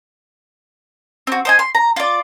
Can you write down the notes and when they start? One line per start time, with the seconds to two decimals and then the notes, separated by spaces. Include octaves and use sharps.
1.27 C4 F#4
1.45 C5 D#5 G#5
1.59 C6
1.75 A#5
1.96 F4 D5